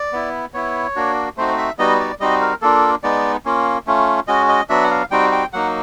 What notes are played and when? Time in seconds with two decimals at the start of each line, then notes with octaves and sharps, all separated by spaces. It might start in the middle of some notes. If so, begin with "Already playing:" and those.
Already playing: D5
0.13 B3 E4
0.54 B3 E4 C#5
0.96 A#3 D4 F#4
1.37 A3 C4 D#4 F#4 C5
1.58 E5
1.79 G3 B3 D#4 F#4 D#5
2.00 D5
2.20 G3 C4 D#4 F#4 D#5
2.41 A#4
2.62 A#3 D4 F4 A4
3.03 G#3 B3 D#4 D5
3.45 A#3 C#4 F4
3.87 A3 C#4 F4
4.28 G#3 C#4 F#4 D#5
4.49 D#5
4.69 F#3 B3 D4 F#4 E5
4.84 F#5
4.91 F5
5.11 G3 C4 D#4 F#4 G5
5.32 G5
5.53 F#3 A#3 D#4 F#5